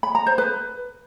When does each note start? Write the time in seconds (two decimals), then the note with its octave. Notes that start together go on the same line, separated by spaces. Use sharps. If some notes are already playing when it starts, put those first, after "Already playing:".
0.03 B5
0.15 A#5
0.26 C5
0.38 B4